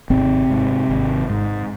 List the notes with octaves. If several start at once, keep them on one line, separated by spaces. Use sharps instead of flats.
G#1 C3 C4
G#2
G#1
G#2